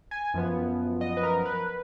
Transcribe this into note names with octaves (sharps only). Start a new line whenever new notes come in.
G#5
F#2 F3 B3
D#5
B4
A#4
B4